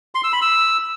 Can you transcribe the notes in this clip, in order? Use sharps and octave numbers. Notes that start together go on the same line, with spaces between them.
C6
E6
B5
E6